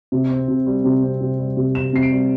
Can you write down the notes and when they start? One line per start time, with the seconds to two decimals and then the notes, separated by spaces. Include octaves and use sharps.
0.12 C3
0.30 C4
0.48 C3
0.66 G3
0.84 C3
1.03 C4
1.21 C3
1.39 G3
1.57 C3
1.75 C4 E7
1.93 C3 C7
2.03 D7
2.12 G3